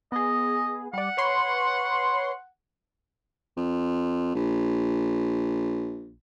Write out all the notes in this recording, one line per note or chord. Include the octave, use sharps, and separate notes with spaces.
B3 G#4 D#5
G3 D5 F#5
B4 C#5 C6
F2
A#1